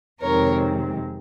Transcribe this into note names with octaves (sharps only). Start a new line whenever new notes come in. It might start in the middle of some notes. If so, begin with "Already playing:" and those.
F2 C3 D#3 G#3 C4 A#4 C#5